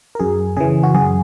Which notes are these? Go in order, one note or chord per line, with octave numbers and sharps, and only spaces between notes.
A#4
F#2 G#4
C#3 E3 G#4
F#4
F#2 G#4